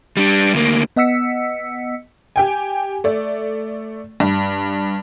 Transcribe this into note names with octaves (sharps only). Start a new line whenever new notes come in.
G3 D4
D2 A#3
B3 D#5 F#5 E6 B6 C#7
G4 G5 G#5
A3 D5
G2